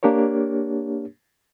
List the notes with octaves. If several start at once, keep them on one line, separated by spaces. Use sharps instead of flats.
A#3 D4 G4 A#4 C#5